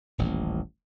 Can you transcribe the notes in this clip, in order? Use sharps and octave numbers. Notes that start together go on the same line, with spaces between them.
D#1 A1 A#2